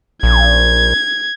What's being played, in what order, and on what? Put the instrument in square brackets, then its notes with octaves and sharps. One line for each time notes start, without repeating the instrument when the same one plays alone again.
[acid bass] A#1 [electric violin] G#6